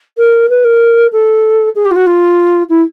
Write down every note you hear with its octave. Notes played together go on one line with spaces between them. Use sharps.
A#4
B4
A#4
A4
G#4
G4
F4
F#4
F4
E4